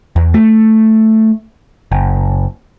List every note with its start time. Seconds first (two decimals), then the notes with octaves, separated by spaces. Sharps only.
0.16 E2
0.34 A3
1.92 F#1